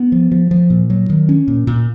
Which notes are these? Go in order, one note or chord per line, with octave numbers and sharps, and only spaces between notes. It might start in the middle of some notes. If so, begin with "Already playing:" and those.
Already playing: B3
F3
F3
F3
A#2
F#3
D#3
C#4
A#2
A#2